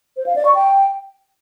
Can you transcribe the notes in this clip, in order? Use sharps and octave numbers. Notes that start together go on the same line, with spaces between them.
C5
F5
D5
C#6
G5